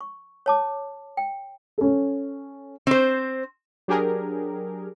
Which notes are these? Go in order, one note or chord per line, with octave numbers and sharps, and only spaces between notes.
C#6
C#5 A5 D6
G5
C#4 A4
C4 C5
F#3 D4 G4 G#4 A#4